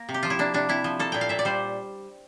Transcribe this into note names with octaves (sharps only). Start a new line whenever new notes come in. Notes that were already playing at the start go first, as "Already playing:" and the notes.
Already playing: A#3 A#4
C3
G4
F3 F4
E4
A#3 D4
C3 D4
C3 E4
F3
A#3 A4
A#2 G5
F5
A#2 E5
D5
G3 C5